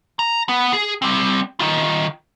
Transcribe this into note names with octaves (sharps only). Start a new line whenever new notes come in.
A#5
B3
G#4
G3 C4
D#3 F4